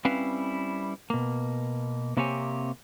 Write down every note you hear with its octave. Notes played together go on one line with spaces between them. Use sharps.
G3 C4 C#4 E4 B4 F5
B2 A#3
C3 A#3 C4 G4 C#5 G#5